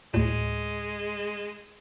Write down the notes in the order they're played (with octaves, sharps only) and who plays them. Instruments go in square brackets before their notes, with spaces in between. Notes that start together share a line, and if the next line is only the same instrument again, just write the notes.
[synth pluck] D2 A2 [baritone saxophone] G#3